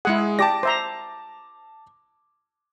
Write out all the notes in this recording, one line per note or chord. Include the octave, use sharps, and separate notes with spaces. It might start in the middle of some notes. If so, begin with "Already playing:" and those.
G#3 E4 G#4 F#5
G4 D5 A5 D6 A#6
C5 E5 A#5